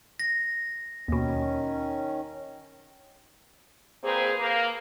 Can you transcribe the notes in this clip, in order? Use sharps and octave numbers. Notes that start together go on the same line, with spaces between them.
A#6
D#2 B2 D#3 C#4
A#2 A#3 C4 G#4 B4 C5
A#3